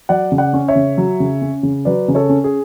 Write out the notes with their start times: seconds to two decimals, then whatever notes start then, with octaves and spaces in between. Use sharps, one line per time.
0.09 F#3 D5 F#5
0.32 C#3
0.38 D5 F#5
0.53 C#4
0.68 C#5 E5
0.75 C#3
0.98 F#3
1.20 C#3
1.42 C#4
1.63 C#3
1.85 F#3 B4 D5
2.08 C#3
2.15 A4 C#5
2.29 C#4
2.44 G#4